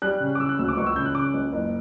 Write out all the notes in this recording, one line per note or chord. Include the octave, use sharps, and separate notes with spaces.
G3 F#6
C#3
D6
C#3 E6
F#6
D2 E6
D6
C#2 C#6
E6
C#3 G6
F#6
C#3 D6
C#2
F#1